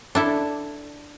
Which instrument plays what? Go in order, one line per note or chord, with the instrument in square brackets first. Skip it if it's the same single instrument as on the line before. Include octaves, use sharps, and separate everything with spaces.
[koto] D4 E4 A4